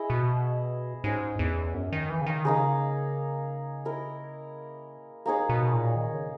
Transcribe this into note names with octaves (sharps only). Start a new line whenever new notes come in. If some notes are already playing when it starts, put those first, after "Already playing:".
Already playing: E4 G#4 D#5
B2
G#2 C#4 G#4 D#5
E2
F#2
D#3
E3
C#3
D#3
C#3 A#3 D#4 G#4
E4 A#4 D#5
A#3 D#4 G#4 C#5
B2
A#2
D#3
C#3